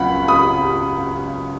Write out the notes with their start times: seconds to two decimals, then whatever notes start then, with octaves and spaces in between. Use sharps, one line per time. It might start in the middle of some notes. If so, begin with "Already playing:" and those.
Already playing: C#2 C#3 F#3 F#5 B5
0.28 B5 D#6